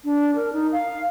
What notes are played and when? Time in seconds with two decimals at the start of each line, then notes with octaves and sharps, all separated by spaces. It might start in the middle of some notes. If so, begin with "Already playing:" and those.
0.05 D4
0.36 A#4
0.53 D#4
0.72 F5